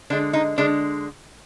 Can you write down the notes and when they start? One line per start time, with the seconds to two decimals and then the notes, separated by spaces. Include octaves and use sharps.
0.10 D3 G#3 D4
0.33 D#4
0.58 D3 G#3 D4